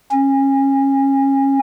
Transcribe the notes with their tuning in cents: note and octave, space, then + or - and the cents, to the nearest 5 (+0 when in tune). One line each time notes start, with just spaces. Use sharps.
C#4 -25